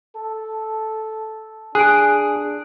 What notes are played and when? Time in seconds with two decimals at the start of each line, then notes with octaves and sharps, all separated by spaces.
0.15 A4
1.75 D4 G#4 F#6 D7